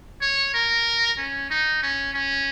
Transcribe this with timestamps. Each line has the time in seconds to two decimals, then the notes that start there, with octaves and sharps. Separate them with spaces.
0.21 C#5
0.54 A#4
1.18 C#4
1.50 D#4
1.82 C#4
2.14 C#4